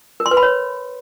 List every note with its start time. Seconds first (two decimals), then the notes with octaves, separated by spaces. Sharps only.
0.20 A#4
0.26 C6
0.31 B4
0.37 B5
0.43 C#5